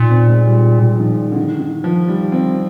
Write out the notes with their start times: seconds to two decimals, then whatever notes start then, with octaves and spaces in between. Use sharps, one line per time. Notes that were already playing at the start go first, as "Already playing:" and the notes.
Already playing: A#2 D#4
0.10 C4
0.28 G#3
0.46 G3
0.95 F3
1.00 D#3
1.32 D3
1.36 D#3
1.60 D#3
1.84 F3
2.08 G3
2.32 C4